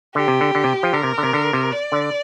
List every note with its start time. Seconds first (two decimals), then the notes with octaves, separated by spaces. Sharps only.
0.15 D3 G4
0.28 C3
0.41 D3
0.55 D3
0.64 C3
0.83 F3
0.93 D3 A#4
1.03 C3
1.18 D3
1.23 C3
1.33 D3
1.53 C3
1.72 D5
1.92 D3